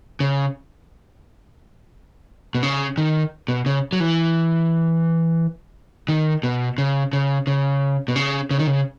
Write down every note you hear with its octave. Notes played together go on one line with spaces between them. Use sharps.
C#3
B2
C#3
D#3
B2
C#3
F#3
E3
D#3
B2
C#3
C#3
C#3
B2
C#3
C#3
D#3
C#3